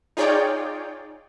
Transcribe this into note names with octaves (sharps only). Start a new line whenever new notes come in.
D#4 F4 G#4 C#5 D5 G5